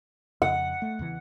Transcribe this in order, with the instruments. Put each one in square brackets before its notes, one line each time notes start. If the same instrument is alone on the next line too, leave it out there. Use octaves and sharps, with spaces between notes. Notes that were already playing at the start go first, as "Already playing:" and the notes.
[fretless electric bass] F2 C#3 [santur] F#5
[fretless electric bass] A3
E2 C#3 E3